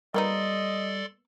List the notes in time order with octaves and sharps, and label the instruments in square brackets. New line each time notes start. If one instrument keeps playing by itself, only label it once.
[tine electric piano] G3 [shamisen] A#3 B3 D#4 [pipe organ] A4 D5 C6 [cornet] D#5